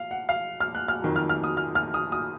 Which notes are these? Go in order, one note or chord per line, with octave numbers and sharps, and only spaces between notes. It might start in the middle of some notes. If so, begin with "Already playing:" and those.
Already playing: F5
F#5
F5
F6
F#6
F6
F2 D#3 F#3
F6
F6
D#6
F6
F6
D#6
D#6